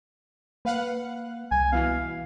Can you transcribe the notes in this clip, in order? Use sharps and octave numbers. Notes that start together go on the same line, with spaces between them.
A#3 B4 F5 F#5
C2 G#5
B2 E3 F5